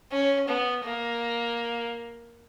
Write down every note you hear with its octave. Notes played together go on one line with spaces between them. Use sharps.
C#4
B3
A#3